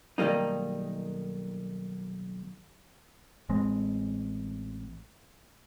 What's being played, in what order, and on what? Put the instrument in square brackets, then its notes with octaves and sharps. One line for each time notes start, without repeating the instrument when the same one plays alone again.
[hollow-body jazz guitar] B1 D#3 G3 A#3 D#4
[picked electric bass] A1 G#3 C4